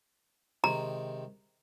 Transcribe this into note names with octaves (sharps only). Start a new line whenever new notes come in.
C3 D#3 G#3 A#5